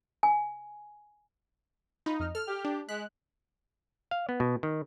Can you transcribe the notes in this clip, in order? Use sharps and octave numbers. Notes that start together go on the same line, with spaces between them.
G#5
D#4 F4 B5
F2 D#5 F6
A4 F6
G4
D4
G#3 F#6 B6
F5
B3
B2
D#3